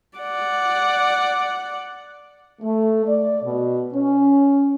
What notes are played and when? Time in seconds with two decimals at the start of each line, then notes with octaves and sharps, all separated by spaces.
0.18 D5 F#5
2.62 A3
3.06 D5
3.43 B2
3.94 C#4